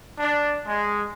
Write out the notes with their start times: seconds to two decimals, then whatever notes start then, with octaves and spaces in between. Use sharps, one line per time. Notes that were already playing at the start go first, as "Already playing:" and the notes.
0.18 D4
0.65 G#3